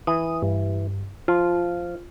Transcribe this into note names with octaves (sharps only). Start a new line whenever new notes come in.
E3 D#6
G2
F3 F4